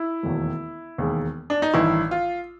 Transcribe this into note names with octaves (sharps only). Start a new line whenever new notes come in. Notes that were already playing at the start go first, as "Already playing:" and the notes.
Already playing: E4
E1 D#2 D#3 F#3 A3
E1 D#2 D#3 G#3
D4
D#4
A1 G2 D#3 E4
F4